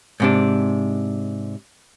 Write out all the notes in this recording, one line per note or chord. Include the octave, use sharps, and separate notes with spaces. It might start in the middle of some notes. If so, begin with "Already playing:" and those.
G#2 C3 D4